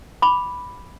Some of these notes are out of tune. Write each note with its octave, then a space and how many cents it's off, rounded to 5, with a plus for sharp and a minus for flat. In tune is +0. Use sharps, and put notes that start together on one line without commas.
B5 +0 D6 +0